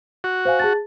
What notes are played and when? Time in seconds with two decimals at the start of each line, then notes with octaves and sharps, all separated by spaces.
0.24 F#4
0.45 C5 F5 G#5
0.59 G#4 A5 A6